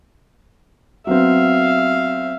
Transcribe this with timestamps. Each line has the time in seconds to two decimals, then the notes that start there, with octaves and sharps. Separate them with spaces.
1.07 F#3 B3 C4 E5 F5